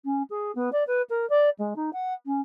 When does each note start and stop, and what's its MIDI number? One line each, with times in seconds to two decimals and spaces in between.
0.04 0.22 61
0.30 0.51 68
0.55 0.69 59
0.72 0.83 74
0.87 1.01 71
1.09 1.28 70
1.29 1.49 74
1.58 1.73 56
1.76 1.90 63
1.93 2.13 78
2.26 2.40 61